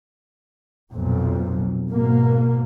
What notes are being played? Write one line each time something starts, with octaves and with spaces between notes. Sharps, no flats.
B1 F2 A#2
G#2 B2 A#3